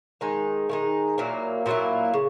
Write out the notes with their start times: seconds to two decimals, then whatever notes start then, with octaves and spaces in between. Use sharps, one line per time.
0.21 D#3 G#3 D#4
0.69 D#3 G#3 D#4
1.18 A#2 F#3 A#3 E4
1.66 A#2 F#3 A#3 E4
2.14 C#3